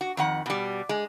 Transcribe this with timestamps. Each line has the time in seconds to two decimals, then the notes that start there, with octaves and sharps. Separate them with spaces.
0.01 F#4
0.17 F2 D#3 F#5
0.46 B2 G3
0.89 G#3